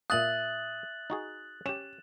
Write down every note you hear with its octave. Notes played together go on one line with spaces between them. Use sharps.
A#2 E5 F5 D#6 F#6 A6 F#7
D#4 F#4 G#4
C#4 G4 E7